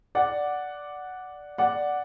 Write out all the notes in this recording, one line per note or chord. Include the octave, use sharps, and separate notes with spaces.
D5 F#5
D5 F#5